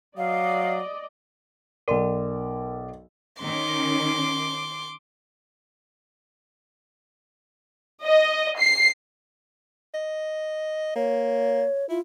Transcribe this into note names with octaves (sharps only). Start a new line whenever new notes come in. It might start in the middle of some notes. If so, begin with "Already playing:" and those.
F#3 D5 D#5 F5
B1 A#4 D5 C6
D#3 C#4 C6 D6
D#5
C7
D#5
A#3 C#5
E4 F4